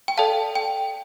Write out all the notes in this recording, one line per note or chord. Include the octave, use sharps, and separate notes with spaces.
G5
A4 D5 F5 A5
G5